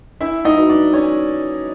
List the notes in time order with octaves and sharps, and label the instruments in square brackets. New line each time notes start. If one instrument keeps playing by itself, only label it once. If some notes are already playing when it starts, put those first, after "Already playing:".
[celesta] D4 [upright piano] E4 E5
[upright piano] D#4 D#5
[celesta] F#4 B4
[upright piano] D4 D5
[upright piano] C#4 C#5 [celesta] D4